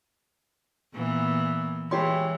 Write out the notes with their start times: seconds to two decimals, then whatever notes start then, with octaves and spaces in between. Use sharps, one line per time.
0.94 A#2 E3 B3
1.91 E3 G#3 G4 C#5 C6